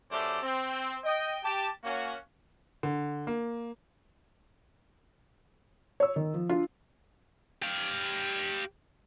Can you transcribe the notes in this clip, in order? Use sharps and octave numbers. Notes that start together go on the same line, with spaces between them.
F#2 A3 G4 A4 C5 D5
C4
D#5 G5
G4 A5
A#3 C#4 F#4
D3
A#3
C#5 E6
D#3
F3
D4 F4
G4 F5